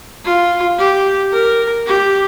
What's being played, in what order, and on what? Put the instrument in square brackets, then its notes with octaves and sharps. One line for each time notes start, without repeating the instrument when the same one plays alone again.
[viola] F4
G4
A#4
G4